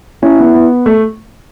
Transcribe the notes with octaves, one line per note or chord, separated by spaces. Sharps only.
C#4 E4
B3
B3
A3